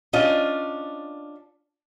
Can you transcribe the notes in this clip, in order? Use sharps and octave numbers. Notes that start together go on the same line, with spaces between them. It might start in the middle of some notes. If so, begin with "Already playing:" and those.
C#4 D4 F4 D#5